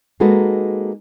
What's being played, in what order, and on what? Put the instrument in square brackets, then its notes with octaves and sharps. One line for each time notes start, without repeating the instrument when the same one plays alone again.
[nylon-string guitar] G#3 A#3 D#4 F#4 A4 B4